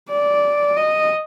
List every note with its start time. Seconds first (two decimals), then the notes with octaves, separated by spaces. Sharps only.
0.11 D5
0.76 D#5